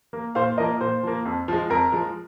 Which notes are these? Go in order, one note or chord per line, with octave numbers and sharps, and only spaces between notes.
A#3
A#2 C5 F5
F3 A#3 A#4 D#5
A#2 C5
F3 A#3
F2
F3 G#3
F2 A#4
F3 G#3